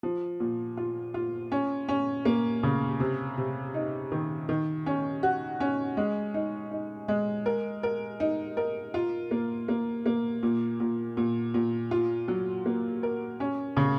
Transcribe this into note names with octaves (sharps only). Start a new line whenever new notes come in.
F3
A#2
F4
F4
C#4
C#4
A#3
C#3
C3
C3
D#4
D#3
D#3
C#4
F#4
C#4
G#3
D#4
D#4
G#3
A#4
A#4
D#4
A#4
F4
A#3
A#3
A#3
A#2
A#2
A#2
A#2
F4
F#3
A#3
A#4
C#4
C#3